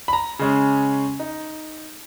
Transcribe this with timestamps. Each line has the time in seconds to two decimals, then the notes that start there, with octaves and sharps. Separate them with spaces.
0.08 B5
0.13 A#5
0.39 C#3 G#3 C#4
1.20 D#4